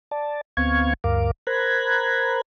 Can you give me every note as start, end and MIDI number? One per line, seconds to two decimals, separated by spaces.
0.11 0.41 74
0.11 0.41 81
0.57 0.93 38
0.57 0.93 59
0.57 0.93 60
0.57 0.93 77
0.57 0.93 85
0.57 0.93 92
1.04 1.31 38
1.04 1.31 43
1.04 1.31 70
1.04 1.31 77
1.04 1.31 86
1.47 2.41 70
1.47 2.41 72
1.47 2.41 82
1.47 2.41 83
1.47 2.41 90
1.47 2.41 92